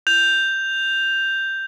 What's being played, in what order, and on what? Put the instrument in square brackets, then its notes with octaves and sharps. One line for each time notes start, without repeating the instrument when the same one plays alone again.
[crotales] G6 F7